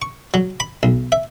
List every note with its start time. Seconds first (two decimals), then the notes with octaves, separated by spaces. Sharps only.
0.02 C#6
0.34 F#3
0.60 B5
0.83 B1
1.12 E5